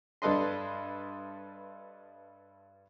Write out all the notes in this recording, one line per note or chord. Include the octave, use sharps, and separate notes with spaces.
G2 D4 A4 B4 D#5 C6